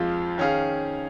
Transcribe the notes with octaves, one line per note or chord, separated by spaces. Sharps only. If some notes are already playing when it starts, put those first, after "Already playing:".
Already playing: F2 F3 G#3 F4
D#3 C#4 G#4 F5